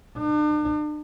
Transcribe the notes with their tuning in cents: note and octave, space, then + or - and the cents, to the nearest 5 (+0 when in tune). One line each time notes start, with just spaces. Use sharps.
D4 +40